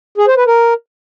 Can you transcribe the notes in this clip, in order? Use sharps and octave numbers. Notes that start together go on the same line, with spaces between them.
G#4
C5
B4
A#4